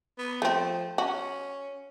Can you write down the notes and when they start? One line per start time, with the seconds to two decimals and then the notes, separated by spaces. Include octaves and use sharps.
0.19 B3
0.42 F3 A3 C4
0.98 C#4 F#4